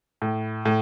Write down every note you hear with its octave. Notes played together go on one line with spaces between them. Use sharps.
A2
A2